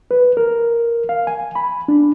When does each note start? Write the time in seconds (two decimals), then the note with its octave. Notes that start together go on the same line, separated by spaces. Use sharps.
0.11 B4
0.37 A#4
1.09 F5
1.27 G#5
1.55 B5
1.88 D4